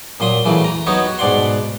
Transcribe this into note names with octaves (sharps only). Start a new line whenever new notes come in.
A#2 F#3 C6 D#6
C#3 E3 F#3 A3
A#5
F#3 B3 D#4 F#4 C#5
F#4
G#2 B2 D5 F#5 C6